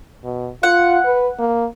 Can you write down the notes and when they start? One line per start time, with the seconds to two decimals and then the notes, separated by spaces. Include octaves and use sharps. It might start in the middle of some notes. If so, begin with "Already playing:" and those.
0.24 B2
0.63 F4 F#5
1.05 B4
1.39 A#3